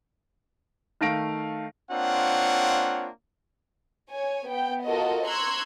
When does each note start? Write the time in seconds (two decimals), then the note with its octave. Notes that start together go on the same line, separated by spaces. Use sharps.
1.01 D#3 A3 F5 A#6 D7
1.91 A#3 C4 D4 F4 C#5 F#5
4.10 C#5 G#5
4.47 B3 G5
4.85 F4 F#4 A4 A#4 D#5
5.26 A#5 C6 C#6 E6 F#6 G#6